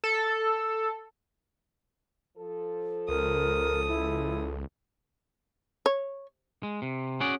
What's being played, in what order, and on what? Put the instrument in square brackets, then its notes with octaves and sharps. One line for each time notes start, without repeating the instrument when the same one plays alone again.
[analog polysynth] A4
[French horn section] F3 A4
[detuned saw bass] C#2 [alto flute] A#4 [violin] D#6
[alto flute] E4
[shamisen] C#5
[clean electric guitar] G#3
C3
C#4 F#4 G#4 D5